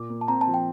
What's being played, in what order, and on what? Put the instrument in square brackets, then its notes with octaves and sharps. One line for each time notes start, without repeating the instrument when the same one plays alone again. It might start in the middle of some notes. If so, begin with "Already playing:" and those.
Already playing: [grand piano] A#2 [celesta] D6
[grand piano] A#3
[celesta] A5
[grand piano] C4 [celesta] A#5
[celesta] A5
[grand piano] F3
[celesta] G5